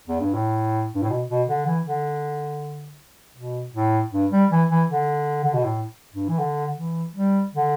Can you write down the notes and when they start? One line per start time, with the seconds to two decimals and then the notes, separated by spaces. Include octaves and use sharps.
0.08 E2
0.20 G2
0.34 A2
0.95 G2
1.03 A2
1.10 B2
1.29 B2
1.48 D3
1.66 E3
1.85 D3
3.37 B2
3.74 A2
4.12 G2
4.31 G3
4.51 E3
4.70 E3
4.88 D3
5.44 D3
5.54 B2
5.64 A2
6.14 G2
6.28 E3
6.39 D3
6.77 E3
7.15 G3
7.54 D3